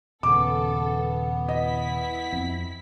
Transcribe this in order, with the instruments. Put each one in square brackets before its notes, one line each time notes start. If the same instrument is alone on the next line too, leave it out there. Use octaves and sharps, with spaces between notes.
[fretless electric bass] D#1 C#3 [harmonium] B3 [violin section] A4 [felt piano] D6
[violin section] E4 B6 [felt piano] D#5
[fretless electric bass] F2 C4